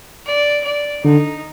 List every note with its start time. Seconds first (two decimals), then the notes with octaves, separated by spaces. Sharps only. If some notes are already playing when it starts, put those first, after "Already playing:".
0.26 D5
0.64 D5
1.04 D3 D#4